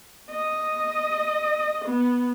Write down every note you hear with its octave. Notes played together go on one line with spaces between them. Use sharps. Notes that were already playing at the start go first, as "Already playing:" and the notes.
D#5
B3